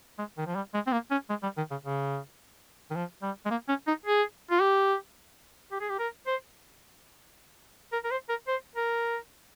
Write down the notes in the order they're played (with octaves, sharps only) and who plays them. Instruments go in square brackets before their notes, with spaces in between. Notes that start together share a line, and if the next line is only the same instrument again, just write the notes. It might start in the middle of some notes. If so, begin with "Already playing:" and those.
[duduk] G#3
D#3
F3
G3
G#3
C4
A#3
C#4
G#3
G3
D#3
C#3
C#3
D#3
F3
G3
G#3
A#3
C#4
D#4
G#4
F4
G4
G4
G#4
G4
A#4
C5
A#4
A#4
C5
A#4
C5
A#4